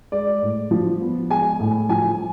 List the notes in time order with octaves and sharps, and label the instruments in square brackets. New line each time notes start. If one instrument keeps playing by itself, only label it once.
[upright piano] G#3 D5
A2
F3
B3
G#3 G#5
A2
F3 G#5